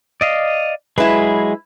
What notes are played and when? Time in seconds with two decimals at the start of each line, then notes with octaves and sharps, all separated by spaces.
0.21 D5 D#5 F5
0.98 F#3 G#3 E4 G#4 B4